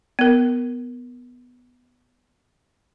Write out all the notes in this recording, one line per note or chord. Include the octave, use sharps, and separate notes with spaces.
B3 A#4